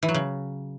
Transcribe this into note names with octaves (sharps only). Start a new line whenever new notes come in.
E3
F#3
C#3